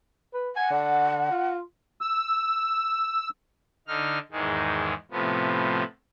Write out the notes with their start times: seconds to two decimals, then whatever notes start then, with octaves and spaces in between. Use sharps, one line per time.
0.34 B4
0.56 F#5 G#5
0.70 D3
1.31 F4
2.01 E6
3.88 D3 D#4 F6
4.31 E2 G#2 D#3 G#3
5.11 A2 C3 F3 B3